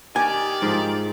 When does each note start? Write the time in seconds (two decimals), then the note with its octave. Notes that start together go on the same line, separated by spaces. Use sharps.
0.16 D#3 G4 D5 G#5
0.62 G#2 F3